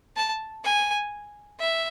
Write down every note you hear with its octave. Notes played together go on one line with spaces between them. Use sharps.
A5
G#5
E5